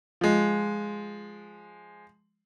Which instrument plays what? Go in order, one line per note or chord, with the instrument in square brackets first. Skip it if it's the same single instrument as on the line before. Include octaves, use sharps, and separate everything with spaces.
[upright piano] F3 G#3